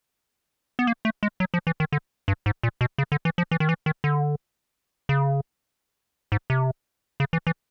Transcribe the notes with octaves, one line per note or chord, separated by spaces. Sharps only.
B3
A#3
A3
G#3
F#3
F3
E3
D#3
D3
G2
G#2
A#2
B2
C#3
D3
E3
F3
E3
D#3
E3
D#3
D3
C#3
G#2
C3
C#3
E3
E3